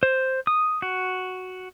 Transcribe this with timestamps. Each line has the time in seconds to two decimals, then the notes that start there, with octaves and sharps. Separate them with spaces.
0.03 C5
0.47 D#6
0.82 F#4